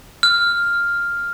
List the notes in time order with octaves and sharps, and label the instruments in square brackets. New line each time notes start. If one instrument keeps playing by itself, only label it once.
[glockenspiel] F6